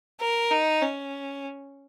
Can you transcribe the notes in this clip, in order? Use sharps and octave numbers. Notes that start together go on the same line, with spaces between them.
A#4
D#4
C#4